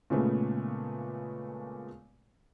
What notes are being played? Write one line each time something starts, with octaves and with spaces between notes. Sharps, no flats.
A#2 C#3 G#3 A3 B3